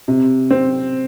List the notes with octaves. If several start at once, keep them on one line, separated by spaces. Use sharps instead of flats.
C3
C4